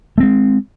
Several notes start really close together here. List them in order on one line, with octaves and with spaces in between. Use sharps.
A3 C4 G#3